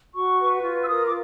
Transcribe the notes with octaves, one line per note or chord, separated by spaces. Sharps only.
F#4 C#6
B4
F4
E6
A#4 D#6
D6